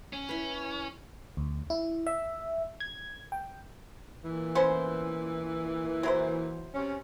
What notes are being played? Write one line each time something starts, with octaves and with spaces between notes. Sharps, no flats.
C#4
E4 B4
D2
E4
E5
G#6
G5
A#2 E3
B3 C#4 C5
F#3 E4 C5
C3 C#4